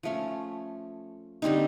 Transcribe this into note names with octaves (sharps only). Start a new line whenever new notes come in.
F3 A3 C#4
D3 G3 C4 D#4